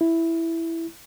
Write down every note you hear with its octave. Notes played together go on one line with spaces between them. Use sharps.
E4